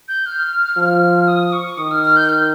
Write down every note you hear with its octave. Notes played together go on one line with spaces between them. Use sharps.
G6
F6
F3
D#6
C#6
D#3 D#6
F6
F6
G6
F6